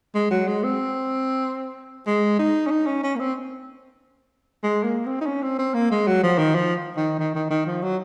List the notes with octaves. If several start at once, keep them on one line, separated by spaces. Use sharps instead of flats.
G#3
F#3
G#3
C4
G#3
D#4
C#4
D#4
C#4
C#4
A#3
C4
G#3
A#3
C4
D#4
C#4
C4
C4
A#3
G#3
F#3
F3
D#3
F3
D#3
D#3
D#3
D#3
F3
F#3